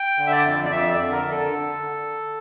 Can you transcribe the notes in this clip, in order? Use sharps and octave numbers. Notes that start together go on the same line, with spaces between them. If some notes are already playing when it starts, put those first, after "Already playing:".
Already playing: G5
D3
E5
D5
F2
D5
F2 E5
D5
D3
A#4
D3
A4
D3